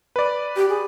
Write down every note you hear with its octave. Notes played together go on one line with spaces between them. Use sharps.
B4 D5
G4
G#4